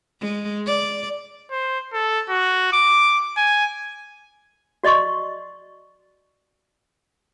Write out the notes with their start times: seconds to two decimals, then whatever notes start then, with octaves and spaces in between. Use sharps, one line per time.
0.21 G#3
0.66 D5
1.51 C5
1.93 A4
2.29 F#4
2.73 D6
3.37 G#5
4.84 F#4 D5 D#5 C6 C#6